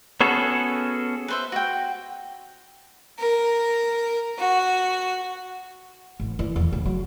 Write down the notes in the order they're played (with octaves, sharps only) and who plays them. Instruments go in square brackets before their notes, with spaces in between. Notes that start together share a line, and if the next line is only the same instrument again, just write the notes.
[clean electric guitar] B3 C#4 F#4 G#4 A4
[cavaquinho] B4 C5 E5
F#4 G5
[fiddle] A#4
F#4
[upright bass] A1
E3
E2
C#3
F#3